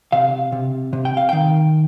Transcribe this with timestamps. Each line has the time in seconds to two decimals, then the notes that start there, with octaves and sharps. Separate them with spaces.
0.12 C3 F5
0.52 C3
0.93 C3
1.05 G5
1.17 F5
1.29 D#3 G5